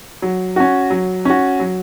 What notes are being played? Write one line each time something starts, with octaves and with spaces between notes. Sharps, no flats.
F#3
C#4 F#4
F#3
C#4 F#4
F#3